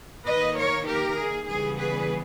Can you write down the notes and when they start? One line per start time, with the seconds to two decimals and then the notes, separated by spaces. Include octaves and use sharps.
0.26 D#3 A#3 D#4 B4 D#5
0.56 A#4 C#5
0.86 G4 A#4
1.18 G#4
1.47 C#3 E3 G3 B3 G#4
1.78 G#4 B4